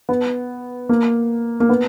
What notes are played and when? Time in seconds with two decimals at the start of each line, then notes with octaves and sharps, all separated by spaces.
0.09 B3
0.89 A#3
1.60 A#3
1.69 B3